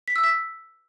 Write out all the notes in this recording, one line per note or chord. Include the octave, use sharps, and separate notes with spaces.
B6
E6
B6